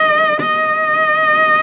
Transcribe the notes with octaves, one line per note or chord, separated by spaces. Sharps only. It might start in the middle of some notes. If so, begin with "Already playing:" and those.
Already playing: D#5
D#5